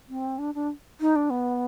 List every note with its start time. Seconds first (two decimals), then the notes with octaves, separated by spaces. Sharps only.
0.09 C4
0.39 D4
0.55 D4
1.00 D#4
1.16 D4
1.30 B3